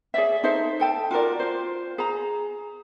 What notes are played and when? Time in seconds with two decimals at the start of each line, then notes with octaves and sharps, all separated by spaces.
0.14 G#4 C#5 D5 E5
0.44 D#4 A4 C5 E5
0.80 A4 G5 A5
1.11 F4 F#4 A#4 D5
1.40 F4 C5
1.98 G#4 A#5